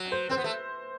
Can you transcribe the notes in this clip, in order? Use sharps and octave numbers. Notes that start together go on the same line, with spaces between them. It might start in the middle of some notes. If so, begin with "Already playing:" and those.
Already playing: F#3
C5
C4 C5
B3
A3